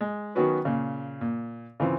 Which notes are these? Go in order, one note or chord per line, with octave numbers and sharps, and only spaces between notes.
G#3
D#3 F#3 B3 C#4 F#4 B4
A#2 C#3
A#2
C#3 E3 C4 F4